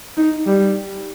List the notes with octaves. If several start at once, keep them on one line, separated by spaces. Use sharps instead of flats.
D#4
G3